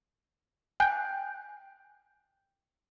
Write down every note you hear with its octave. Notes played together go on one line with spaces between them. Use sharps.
G5 G#5 F#6 G6